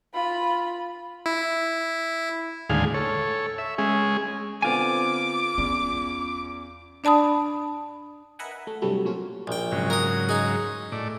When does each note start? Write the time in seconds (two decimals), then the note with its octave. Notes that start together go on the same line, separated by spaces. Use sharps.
0.15 F4 B5
1.26 E4
2.70 D#2 A2 D3 G#3 G#4 F5
2.94 A4 C#5
3.58 E5
3.78 G#3 C#4 G#4
4.62 D3 B3 C4 F4 G#5 D6
5.58 E2 C#4
7.04 D4 D5 A5 B5 D#6
8.39 A#4 B4 D#5 E5 F#5 G#5
8.51 F#5
8.67 A3
8.82 G2 C3 F#3 G3 A3 E4
9.05 A#2 F#3 C#4 F4
9.47 A#1 G5
9.72 G#2 C#3 F#3
9.90 A#4 D#6
10.29 D#4 G#4
10.92 A2 D5